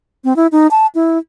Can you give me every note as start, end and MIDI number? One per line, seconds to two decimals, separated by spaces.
0.24 0.36 60
0.36 0.47 64
0.52 0.67 63
0.71 0.87 81
0.95 1.18 64